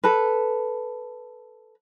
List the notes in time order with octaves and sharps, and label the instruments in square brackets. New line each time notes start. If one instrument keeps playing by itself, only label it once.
[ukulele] A4 B4